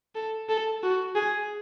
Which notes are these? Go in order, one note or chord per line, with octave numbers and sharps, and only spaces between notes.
A4
A4
F#4
G#4